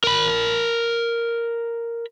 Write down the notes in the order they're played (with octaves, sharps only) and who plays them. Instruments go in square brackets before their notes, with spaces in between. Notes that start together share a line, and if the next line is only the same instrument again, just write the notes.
[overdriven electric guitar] A#4 B5